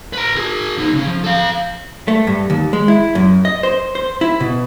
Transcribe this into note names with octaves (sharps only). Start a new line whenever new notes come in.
B4 A#5
G#4 A#4
E2 D#4
C#3 C#4
F3
A4 F5
A3
G2
D#2
G#3
E4
F#2
D#5
C5
C5
E4
B2